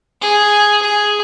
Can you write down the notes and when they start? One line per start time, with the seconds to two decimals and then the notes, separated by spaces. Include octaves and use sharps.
0.22 G#4
0.82 G#4